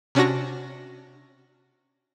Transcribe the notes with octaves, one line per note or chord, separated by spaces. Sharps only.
C3 C#4 D4 F#4 A#6